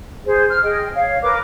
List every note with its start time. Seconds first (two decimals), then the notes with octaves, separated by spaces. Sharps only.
0.25 G#4 C5
0.50 F6
0.63 G#4 D#5 G5
0.94 C#5 F5
1.22 A#4 B4 D6